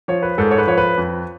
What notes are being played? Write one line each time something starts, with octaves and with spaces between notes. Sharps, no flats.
F3 C#5
B4
G#2 A4
C#5
B4
F3 C#5
B4
F2